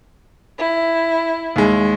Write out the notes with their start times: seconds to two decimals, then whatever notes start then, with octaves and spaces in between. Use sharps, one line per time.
0.57 E4
1.56 D#2 G#3